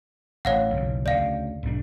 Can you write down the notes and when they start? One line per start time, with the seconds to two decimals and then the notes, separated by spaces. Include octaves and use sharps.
0.45 A1 C#5 F5 F#5
0.74 F#1 B1 E2
1.06 D2 C#3 D5 F5
1.63 B1 G#2 D4